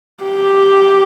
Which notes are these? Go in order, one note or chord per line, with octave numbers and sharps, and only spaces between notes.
G4